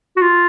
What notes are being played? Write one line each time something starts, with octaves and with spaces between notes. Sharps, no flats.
F#4
F4